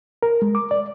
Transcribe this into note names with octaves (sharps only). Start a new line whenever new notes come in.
A#4
G#3
D6
D5